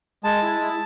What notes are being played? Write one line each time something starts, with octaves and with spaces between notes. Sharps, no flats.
G#3 A5
E4
E4